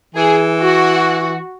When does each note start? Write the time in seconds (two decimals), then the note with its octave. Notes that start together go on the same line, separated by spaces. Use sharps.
0.15 E3 G#4
0.60 F#4